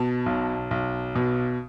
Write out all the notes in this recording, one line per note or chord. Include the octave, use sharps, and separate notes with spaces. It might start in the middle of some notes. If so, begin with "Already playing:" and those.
Already playing: B2 A5
B1
B1
B2